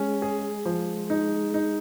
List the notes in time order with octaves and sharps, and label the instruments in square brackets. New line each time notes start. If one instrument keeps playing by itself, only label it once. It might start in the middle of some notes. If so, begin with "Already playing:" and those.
Already playing: [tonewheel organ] G#3 [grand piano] C#4
[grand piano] G#4
F3
D#4
D#4